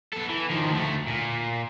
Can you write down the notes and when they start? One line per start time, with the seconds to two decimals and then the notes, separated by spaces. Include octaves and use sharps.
0.13 B3 A4
0.29 E3
0.50 D#3 F3
0.71 D2 A3
1.07 A#2